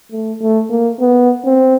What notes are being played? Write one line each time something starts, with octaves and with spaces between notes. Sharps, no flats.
A3
A3
A#3
B3
C4